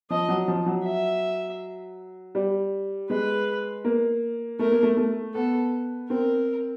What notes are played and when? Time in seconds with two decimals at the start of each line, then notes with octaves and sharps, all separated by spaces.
0.10 F3 D#5
0.29 F#3
0.48 F3
0.66 F#3
0.84 E5
2.35 G3
3.10 G#3 B4
3.85 A#3
4.59 A3 A#4
4.72 A#3
4.83 A3
4.97 A3
5.34 B3 A4
6.10 C4 A#4